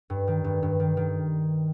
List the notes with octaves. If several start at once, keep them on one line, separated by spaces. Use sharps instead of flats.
G2
D#3
G2
G2
D#3
D#3